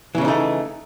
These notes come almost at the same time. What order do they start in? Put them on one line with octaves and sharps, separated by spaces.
E3 C#3 C#4 D#4 A3